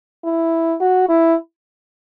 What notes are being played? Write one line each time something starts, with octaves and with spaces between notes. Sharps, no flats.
E4
F#4
E4